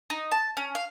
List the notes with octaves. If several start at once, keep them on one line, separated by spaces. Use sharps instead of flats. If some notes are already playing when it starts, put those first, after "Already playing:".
D#4
A5
C#4
F5